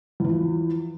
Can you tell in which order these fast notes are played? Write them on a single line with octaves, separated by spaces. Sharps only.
E2 E3 F3